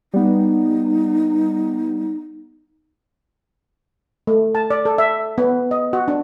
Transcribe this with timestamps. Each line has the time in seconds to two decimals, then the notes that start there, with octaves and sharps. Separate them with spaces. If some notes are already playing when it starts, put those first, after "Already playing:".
0.14 G3 B3 D#4
4.27 A3
4.55 A5
4.70 D5
4.85 A4
4.98 E5
5.38 B3
5.71 D#5
5.93 F#4
6.08 D4